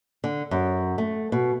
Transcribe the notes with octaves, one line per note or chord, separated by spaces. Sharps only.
D3
F#2
A3
B2